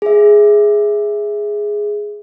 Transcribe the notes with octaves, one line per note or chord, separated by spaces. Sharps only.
G#4 E5